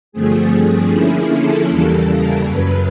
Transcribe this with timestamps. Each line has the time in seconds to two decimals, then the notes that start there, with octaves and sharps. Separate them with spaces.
0.12 G2 D3 F3 A3 C4 G#4
0.90 D3 F3 A#3 C#4 E4
1.29 A4
1.68 E2 C#3 E3 G3 A#3
2.06 A#4
2.45 F#2 C#3 F#3 B4